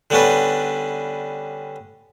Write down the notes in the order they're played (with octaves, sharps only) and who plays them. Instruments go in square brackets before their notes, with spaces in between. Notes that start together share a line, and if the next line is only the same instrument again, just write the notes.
[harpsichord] D3 G3 B3 C#4 D4 B4